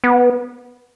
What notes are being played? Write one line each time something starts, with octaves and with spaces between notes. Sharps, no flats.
B3